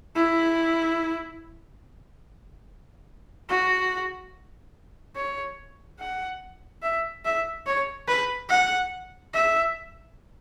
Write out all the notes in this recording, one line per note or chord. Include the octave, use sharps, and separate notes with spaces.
E4
F#4
C#5
F#5
E5
E5
C#5
B4
F#5
E5